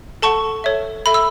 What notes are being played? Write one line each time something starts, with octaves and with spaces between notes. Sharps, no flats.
A4 F#5 A5 C#6
A4 C#5 E5
A4 E5 B5
E6